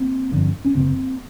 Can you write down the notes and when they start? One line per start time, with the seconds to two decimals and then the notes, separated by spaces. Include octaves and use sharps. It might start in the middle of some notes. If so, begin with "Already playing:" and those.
Already playing: A#3 C4
0.32 G1 F2 D3
0.65 C#4
0.75 F#1 E2 C#3 A#3 C4